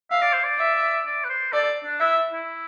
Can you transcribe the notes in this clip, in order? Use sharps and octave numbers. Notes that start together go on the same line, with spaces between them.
E5 F5
D5
C5
D5
E5
D5
B4
C5
A4 D5
D4
E4 E5
E4